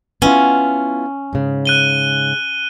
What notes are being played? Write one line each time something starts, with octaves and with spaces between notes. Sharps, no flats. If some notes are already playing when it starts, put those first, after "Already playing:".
B3 C#4 E4 F4
G#2 C#3
F#6 D#7 G7